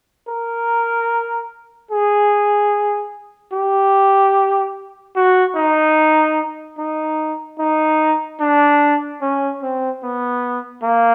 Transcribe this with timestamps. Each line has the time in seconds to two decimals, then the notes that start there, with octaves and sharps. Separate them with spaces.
0.28 A#4
1.91 G#4
3.53 G4
5.16 F#4
5.56 D#4
6.78 D#4
7.59 D#4
8.41 D4
9.22 C#4
9.62 C4
10.03 B3
10.83 A#3